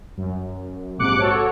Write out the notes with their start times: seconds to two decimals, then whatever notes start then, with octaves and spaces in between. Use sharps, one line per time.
0.17 F#2
0.98 A#1 G#2 C3 D6 F#6 C#7
1.19 F#4 A4 C#5